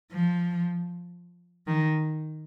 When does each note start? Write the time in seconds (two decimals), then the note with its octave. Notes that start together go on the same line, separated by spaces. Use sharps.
0.12 F3
1.67 D#3